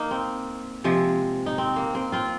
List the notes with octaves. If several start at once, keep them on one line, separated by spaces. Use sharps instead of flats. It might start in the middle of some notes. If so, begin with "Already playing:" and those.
Already playing: A#3 D#4
C4
C3 F3 G#3
D#4
C4
A#3
C4
C4 F4